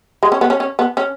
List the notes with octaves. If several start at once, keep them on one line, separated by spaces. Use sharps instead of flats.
G#3
C#4
B3
C#4
C#4
B3
C#4